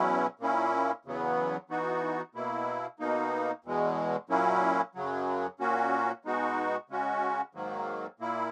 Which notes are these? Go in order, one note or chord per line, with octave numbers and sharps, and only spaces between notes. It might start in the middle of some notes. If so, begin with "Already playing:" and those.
Already playing: E2 B2 F#3 C#4 E4
A#2 A#3 C#4 E4
E2 C#3 F#3 B3
E3 B3 D#4 F#4
B2 A#3 E4
B2 A#3 D#4
E2 B2 G#3
A#2 F#3 A#3 C#4 E4
F#2 C#3 F#3
A#2 A#3 C#4 F#4
B2 G#3 D#4 F#4
C#3 G#3 C#4 F#4
G#2 D#3 F#3 A#3
A#2 A#3 E4